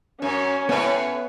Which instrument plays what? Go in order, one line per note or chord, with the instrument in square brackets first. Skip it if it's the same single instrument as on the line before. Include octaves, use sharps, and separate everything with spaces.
[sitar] F#2 [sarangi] C#4
[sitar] A2 C#5 [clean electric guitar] B3